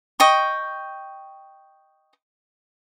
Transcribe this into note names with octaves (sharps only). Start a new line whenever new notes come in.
D#5 G5 C#6